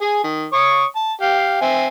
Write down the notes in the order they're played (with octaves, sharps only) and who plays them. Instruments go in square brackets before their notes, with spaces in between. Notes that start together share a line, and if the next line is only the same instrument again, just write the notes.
[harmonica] G#4 G#5
D#3
C#5 C#6 D#6
A5
G4 F5
C4 E5 G#5